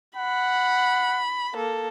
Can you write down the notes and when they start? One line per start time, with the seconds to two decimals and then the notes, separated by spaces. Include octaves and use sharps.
0.16 F#5 B5
1.54 A#3 A4